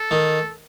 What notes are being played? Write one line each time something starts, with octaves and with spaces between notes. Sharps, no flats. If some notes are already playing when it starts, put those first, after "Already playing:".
Already playing: A4
D#3